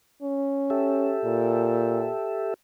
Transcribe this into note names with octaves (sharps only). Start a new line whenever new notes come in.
C#4
G4 A4 E5
A#2